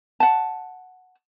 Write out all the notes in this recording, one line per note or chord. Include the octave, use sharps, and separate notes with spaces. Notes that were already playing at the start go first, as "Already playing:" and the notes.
F#5 A5